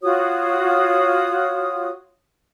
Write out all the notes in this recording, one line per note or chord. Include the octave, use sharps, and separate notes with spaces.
F4 F#4 C#5 D#6